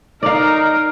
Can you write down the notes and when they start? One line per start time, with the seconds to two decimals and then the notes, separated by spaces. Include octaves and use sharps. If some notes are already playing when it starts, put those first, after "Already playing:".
0.23 D#4 A#4 D5 F5